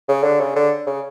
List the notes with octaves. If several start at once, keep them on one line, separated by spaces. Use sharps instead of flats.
C#3
D3
C#3
D3
C#3